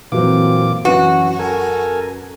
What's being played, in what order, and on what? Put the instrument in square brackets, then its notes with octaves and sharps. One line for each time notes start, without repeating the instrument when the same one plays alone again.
[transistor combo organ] A#2 F4 D6 [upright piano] E3 F#3 C4
[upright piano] F#2 B4 [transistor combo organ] E3 C#4 [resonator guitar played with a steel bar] F#4
[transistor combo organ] A4 A#4 G#5